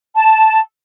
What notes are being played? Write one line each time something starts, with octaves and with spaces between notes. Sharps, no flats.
A5